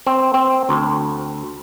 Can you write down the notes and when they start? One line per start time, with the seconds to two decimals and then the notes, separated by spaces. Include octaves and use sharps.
0.07 C4
0.34 C4
0.69 D2